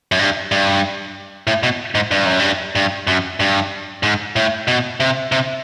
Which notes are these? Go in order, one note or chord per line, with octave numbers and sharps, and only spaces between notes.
F#2
G2
G2
A2
B2
G#2
G2
F#2
G2
G2
F#2
G2
G#2
A2
B2
C3
C3